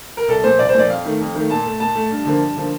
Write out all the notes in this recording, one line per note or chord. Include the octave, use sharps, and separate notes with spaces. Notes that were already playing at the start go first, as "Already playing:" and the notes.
A#4
C2 A4
A#2 F3 C5
C2 D5
C5
A#2 F3 D5
F2 F5
D#3 A3
F2
D#3 A3
A#2 A5
A3
A#2 A5
A3
G2
D3 F3 A#3
G2
D3 F3 A#3